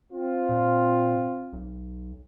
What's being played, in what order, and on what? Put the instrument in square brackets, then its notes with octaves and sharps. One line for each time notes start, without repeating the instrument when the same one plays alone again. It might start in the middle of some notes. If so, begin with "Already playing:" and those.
[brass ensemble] C4 F4
[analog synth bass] A#2
B1